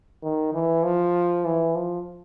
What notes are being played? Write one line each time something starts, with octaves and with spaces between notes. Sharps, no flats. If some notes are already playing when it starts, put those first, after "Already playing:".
D#3
E3
F3
E3
F3